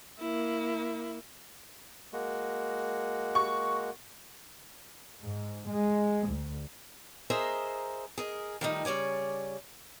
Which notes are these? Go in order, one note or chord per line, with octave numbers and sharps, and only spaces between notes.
A#3 E4
G#3 A#3 F#4
C#6
G#2
G#3
D2
G#4 A#4 C5 D#5 E5 A#5
G#4 A#4 D#5
D#3 F3 G3 A3 D4 D#4
C#3 G3 C#5 D5 G#5